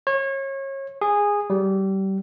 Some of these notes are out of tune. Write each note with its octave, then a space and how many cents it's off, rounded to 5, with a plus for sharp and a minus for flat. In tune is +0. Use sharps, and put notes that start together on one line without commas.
C#5 -30
G#4 -15
G3 -25